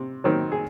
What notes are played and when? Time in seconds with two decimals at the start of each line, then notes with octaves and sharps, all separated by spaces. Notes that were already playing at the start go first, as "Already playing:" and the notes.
Already playing: C3
0.24 D#3 F#3 C4
0.52 G#4